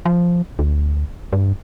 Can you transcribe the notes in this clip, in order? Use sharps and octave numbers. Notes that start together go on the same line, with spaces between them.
F3
D2
G2